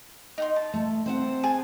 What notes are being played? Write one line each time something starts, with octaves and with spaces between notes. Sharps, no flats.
D#4 F#5 C6
A5
A3
C4 C5 F#5
G#4 G#5 A5